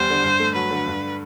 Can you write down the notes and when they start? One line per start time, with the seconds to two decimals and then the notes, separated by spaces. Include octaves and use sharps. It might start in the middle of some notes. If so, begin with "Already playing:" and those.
Already playing: E2 G3 B3 C5
0.10 D3
0.24 G2
0.40 A3
0.55 F#3 B4
0.70 D3
0.87 G2